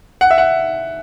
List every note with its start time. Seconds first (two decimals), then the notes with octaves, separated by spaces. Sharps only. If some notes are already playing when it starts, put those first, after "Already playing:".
0.21 F#5
0.31 E5
0.38 F#5